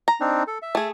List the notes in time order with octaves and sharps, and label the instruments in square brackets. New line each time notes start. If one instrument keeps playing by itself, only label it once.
[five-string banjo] A#5
[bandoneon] C4 D4 D#4
A4
E5
[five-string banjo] A3 G#4